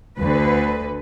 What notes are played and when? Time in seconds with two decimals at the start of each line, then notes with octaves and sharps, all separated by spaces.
0.18 D2 D3 B4